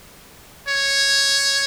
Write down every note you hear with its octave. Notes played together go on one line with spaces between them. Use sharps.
C#5